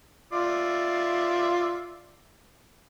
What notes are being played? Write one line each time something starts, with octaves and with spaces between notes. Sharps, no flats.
F4 D5 E5